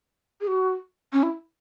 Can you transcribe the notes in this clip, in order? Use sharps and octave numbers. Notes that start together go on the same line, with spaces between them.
G#4
F#4
C#4
E4